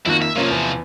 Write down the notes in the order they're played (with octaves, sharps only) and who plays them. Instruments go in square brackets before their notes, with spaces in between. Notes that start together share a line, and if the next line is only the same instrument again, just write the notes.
[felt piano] F2 D#3 A#3 [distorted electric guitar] E4 F#4
[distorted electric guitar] E5
[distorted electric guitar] C3 F3 [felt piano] A#3 C#4 F4
[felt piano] E2